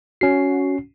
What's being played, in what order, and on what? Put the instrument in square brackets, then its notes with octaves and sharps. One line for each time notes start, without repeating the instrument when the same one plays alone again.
[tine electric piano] C#4 C7 [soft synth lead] F#4